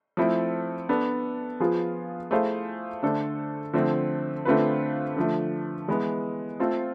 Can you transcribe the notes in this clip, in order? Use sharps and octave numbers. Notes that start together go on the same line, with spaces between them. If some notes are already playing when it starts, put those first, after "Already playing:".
F3 A3 C4 E4 A4
B3 D4 A4
F3 B3 F4 G#4
A3 E4 G#4 C5 F5
D3 A3 D4 A4 C5
D3 F3 A3 C4
D3 A3 C4 F4 B4
D3 F3 A3
E3 G#3 B3
A3 C4 F4 A4